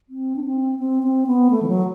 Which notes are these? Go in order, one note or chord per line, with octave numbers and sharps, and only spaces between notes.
C4
D4
C4
C4
C4
B3
A3
E3
F#3